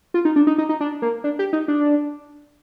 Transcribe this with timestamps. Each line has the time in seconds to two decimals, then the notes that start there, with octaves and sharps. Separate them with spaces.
0.14 F4
0.25 D#4
0.36 D4
0.47 D#4
0.58 D#4
0.69 D#4
0.81 D4
1.02 A#3
1.24 D4
1.39 G4
1.53 D#4
1.68 D4